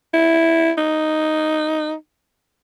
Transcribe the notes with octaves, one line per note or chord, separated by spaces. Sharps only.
E4
D#4